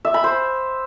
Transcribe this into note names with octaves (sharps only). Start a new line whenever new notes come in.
E5
B5
C5